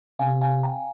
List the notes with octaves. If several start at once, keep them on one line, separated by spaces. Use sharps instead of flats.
C3 F5 G#5
F5 G#5
G5 A#5